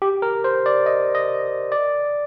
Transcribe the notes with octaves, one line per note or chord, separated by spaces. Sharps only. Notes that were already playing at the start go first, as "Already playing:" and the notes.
G4
A#4
C5
D5
D#5
D#5
D5